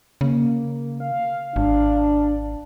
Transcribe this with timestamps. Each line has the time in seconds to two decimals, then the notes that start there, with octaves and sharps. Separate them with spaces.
0.21 C#3 A#3
1.00 F5
1.56 G#1 D4